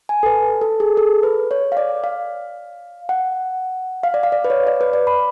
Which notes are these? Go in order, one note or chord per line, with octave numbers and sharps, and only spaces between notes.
G#5
A4
B4
A4
G#4
A4
B4
C#5
F5
D5
F5
F#5
F5
D5
F5
D5
B4
C#5
D5
B4
D5
B5